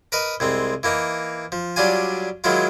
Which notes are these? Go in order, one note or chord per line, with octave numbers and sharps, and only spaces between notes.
A#4 B4 D#5
C2 G#3 C4
E3 A#3 D#4
F3
F#3 G3 D4 F4 G#5
D#3 F#3 G#3 E4 F4